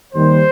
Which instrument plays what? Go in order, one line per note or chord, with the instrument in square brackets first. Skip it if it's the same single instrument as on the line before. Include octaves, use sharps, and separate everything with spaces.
[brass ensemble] D#2 D#3 G3 C5